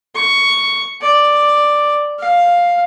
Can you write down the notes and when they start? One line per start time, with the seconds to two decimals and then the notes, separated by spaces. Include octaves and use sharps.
0.15 C#6
1.01 D5
2.19 F5